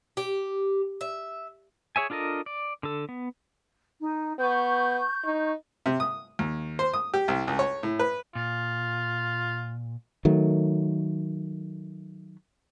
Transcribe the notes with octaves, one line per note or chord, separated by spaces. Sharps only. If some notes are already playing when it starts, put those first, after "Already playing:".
G4
E5
G#4 C#5 E5 G#5
D4 F4 A4 A#4 D#5
D5
D3 A4
B3
D#4
B3 C#6 G6
D#4
C3
D#6
D#2
C5
D#6
G4
C2
C#2
C#5
A2
B4
A#2 F4
D#3 F#3 A3